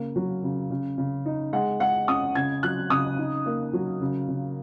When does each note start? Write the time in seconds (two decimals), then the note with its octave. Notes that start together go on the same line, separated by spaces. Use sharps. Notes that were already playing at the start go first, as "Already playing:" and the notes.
Already playing: C#3 A#3
0.16 F#3
0.43 C#3
0.71 C#3
0.98 C#3
1.26 D#4
1.53 G#3 F#5
1.80 G#3 F#5
2.08 C#4 D#6
2.35 C#3 G#6
2.63 F#3 F#6
2.90 C#3 D#6
3.18 D#4
3.46 A#3
3.73 F#3
4.01 C#3
4.28 C#3